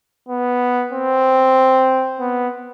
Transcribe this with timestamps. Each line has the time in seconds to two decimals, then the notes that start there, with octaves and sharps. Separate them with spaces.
0.29 B3
0.92 C4
2.19 B3